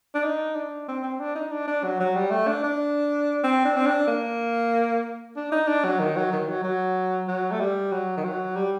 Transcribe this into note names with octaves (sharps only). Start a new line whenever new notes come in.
D4
D#4
D4
C4
C4
D4
D#4
D4
D4
F#3
F#3
G3
A3
D4
D4
C4
D4
C4
D4
A#3
D4
D#4
D4
F#3
D#3
F#3
D#3
F#3
F#3
F#3
A3
G3
F#3
D#3
F#3
G3